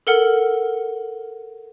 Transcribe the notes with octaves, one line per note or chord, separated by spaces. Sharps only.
A4 A#4 F#5 F6